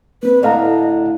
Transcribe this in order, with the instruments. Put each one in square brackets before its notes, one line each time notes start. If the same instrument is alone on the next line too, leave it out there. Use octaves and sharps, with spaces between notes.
[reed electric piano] A#3 C4 [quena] B4
[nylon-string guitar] A2 D3 A3 [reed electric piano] D5 F5 A#5 [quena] D#5